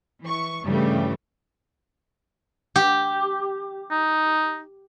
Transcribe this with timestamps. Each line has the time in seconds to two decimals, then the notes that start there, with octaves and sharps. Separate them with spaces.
0.24 E3 C#6
0.65 G2 C#3 E3 G3 A3
2.76 G4
3.91 D#4